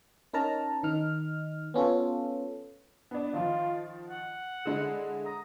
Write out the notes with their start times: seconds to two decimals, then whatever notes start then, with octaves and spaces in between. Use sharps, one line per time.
0.34 C#4 D#4 A#4 A5 A#5
0.83 D#3 D#4 F6
1.74 B3 C#4 F4 A4
3.11 B3 D4
3.33 D#3 F3 F4
4.08 F#5
4.65 D3 G#3 E4
5.26 A#5 D#6